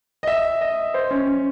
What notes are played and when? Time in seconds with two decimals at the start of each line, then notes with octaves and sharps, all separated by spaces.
0.23 D#5
0.27 E5
0.61 D#5
0.94 C5
1.11 C#4
1.27 C#4